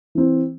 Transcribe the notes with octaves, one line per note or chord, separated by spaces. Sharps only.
E3 C4